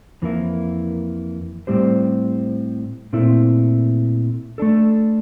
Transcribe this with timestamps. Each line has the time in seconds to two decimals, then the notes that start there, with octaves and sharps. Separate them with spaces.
0.22 F2 E3 A#3 E4
1.67 A2 G3 C4 G4 C5
3.13 A#2 A3 C4 E4
4.58 A3 D4 A4